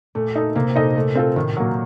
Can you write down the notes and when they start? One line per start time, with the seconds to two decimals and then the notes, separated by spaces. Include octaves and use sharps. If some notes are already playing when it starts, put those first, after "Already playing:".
0.15 A#2 A3
0.35 D#4 A4
0.55 C3 A#3
0.75 A#2 D#4 A4 D#5
0.96 A3
1.15 C4 F4 A4
1.36 A2 D#3
1.56 A#2 F#3 A#3